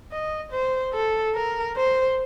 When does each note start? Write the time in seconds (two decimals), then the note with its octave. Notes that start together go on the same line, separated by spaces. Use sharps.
0.12 D#5
0.52 C5
0.94 A4
1.35 A#4
1.77 C5